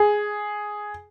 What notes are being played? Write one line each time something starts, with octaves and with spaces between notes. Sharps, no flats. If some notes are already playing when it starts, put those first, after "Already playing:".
Already playing: G#4